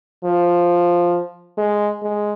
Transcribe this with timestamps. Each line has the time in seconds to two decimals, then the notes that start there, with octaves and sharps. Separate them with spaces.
0.24 F3
1.58 G#3
2.03 G#3